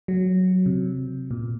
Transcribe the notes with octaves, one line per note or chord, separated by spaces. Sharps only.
F#3
C3
A#2